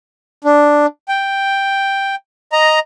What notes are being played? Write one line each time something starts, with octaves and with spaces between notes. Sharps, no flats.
D4
G5
D#5 A#5